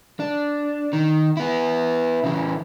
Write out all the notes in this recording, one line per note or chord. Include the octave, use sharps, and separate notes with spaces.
D4
D#3
B3 E4
C#3 E3